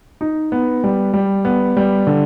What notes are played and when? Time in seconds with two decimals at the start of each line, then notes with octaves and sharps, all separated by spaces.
0.21 D#4
0.52 B3
0.84 G3
1.14 G3
1.45 B3
1.77 G3
2.07 D3